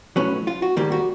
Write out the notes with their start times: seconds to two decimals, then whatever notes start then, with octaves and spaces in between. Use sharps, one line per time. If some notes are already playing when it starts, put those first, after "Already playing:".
0.16 B1 A2 F#3 B3 C#4
0.47 F4
0.62 F#4
0.76 G#2 D#3 G3 A#3 G4
0.92 F#4